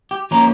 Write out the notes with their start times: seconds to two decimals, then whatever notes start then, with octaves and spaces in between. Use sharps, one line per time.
0.11 G4
0.31 F3 A#3 C#4 F4 A#4